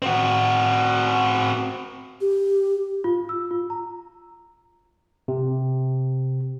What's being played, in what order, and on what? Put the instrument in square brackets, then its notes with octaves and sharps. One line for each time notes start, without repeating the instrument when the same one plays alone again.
[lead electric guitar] C4 F#4
[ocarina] G4
[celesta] F4
E6
F4
A#5
[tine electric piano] C3